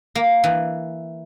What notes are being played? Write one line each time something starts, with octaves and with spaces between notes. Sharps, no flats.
A#3
E3